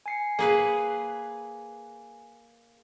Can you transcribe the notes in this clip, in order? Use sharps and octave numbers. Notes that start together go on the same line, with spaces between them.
G#5 C7 C#7
A#3 G#4 B4 G#5